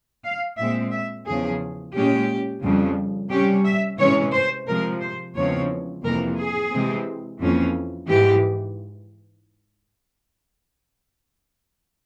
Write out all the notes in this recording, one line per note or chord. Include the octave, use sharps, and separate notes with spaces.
F5
A#2 G#3 C4 E5
E5
E2 C#3 F3 G#4
A#2 G#3 C#4 G4
F2 C#3 G3
C3 G3 C#4 G4
E5
C3 E3 G#3 C#4 C#5
C5
C3 F3 G#3 A#4
C5
E2 C#3 F3 G#3 C4 C#5
F2 C3 E3 A#3 A#4
G#4
C3 E3 G#3 C4
F2 E3 A#3 C#4
G#2 E3 G#3 G4